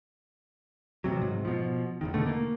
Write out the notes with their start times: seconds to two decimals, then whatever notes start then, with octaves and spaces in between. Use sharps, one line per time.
1.04 A1 C3 F#3
1.22 G#2
1.45 B2 F3
2.01 A1 E2 D#3
2.14 B2 D3 A3
2.26 A#3